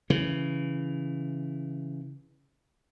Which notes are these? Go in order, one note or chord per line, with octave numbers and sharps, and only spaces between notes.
C#3 E3